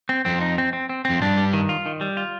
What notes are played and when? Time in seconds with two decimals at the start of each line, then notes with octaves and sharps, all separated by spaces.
0.09 C4
0.25 F2 C4
0.41 D#4
0.58 C4
0.73 C4
0.89 C4
1.05 F2 C4
1.21 G2 D4
1.37 G3
1.53 D#3
1.69 F4
1.86 D#3
2.01 G3
2.17 F4